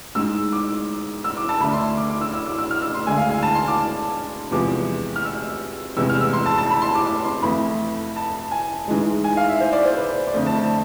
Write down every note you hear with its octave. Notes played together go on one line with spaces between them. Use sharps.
G#2 G#3 E6
D6
E6
D6
A5
D2 D3 A3 B5
C6
D6
D6
E6
E6
D6
E6
F6
E6
C6
D2 D3 G#3 G#5
F5
G#5
A5
C6
D6
E2 C3 F3 G#3 D6
F6
E6
E2 C3 G#3 E6
F6
E6
C6
A5
A5
B5
C6
D6
D6
C6
F2 E3 A3 B5
A5
G#5
G#2 E3 G#3
G#5
F5
E5
C5
D5
C5
B4
D5
F2 D3 A3 C5
A5
A5